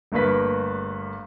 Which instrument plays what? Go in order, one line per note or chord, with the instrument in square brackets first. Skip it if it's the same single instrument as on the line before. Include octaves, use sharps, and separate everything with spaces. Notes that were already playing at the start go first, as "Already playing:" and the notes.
[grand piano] G1 G2 A3 A#3 B4 B6